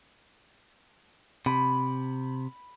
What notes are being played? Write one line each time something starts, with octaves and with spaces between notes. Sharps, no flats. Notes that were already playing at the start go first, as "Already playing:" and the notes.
C3 B5